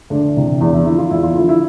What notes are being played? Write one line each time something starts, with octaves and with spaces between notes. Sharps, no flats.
D2 D4
C3 E3
E2 D4
E4
D3 F3 E4
F4
E2 E4
F4
D3 F3 E4
E4